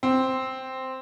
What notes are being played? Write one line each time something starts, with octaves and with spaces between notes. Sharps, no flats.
C4